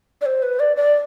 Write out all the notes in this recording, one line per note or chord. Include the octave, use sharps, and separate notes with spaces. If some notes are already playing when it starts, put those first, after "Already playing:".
D5
C5
B4
D5
D5